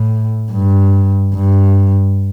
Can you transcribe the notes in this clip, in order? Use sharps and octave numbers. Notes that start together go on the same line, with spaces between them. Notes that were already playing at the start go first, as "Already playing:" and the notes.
Already playing: A2
G2
G2